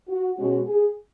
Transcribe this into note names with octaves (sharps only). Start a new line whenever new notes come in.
F#4
B2 G#3 C#4 F#4
G#4